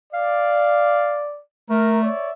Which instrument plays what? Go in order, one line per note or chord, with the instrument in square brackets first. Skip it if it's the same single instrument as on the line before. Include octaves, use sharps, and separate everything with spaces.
[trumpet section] D5 [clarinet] F5
[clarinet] A3 [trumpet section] A#4
[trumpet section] C#5 D5 E5